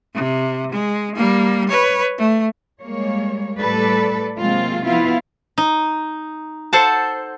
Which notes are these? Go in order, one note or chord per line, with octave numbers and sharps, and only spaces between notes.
C3
G#3
G3 A#3
B4 C#5
A3
G3 G#3 A#3 C#5
A2 G3 A4 B4 D5
C3 F#3 G#3 A#3 C4 F4
F3 B3 E4 F4 F5
D#4
A4 C5 F#5 A5